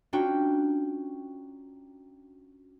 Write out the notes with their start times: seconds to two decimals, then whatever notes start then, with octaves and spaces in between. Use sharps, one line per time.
0.13 C#4 D4 F4 F#4 G5 A#5